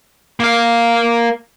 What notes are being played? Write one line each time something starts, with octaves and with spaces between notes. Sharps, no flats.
A#3 F5